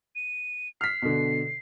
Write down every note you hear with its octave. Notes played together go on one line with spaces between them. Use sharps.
D#7
F6 B6 C7
B2 D3